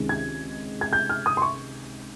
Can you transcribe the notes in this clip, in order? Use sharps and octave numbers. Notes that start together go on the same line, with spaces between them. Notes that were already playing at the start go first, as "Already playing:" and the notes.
Already playing: C#2 C3 D#3 G#3 C#4
G#6
G#6
G6
F6
D#6
C6
C#6